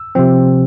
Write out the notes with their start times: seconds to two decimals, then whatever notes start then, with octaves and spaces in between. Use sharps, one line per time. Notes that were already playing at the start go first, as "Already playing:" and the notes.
Already playing: E6
0.15 C3 F3 C4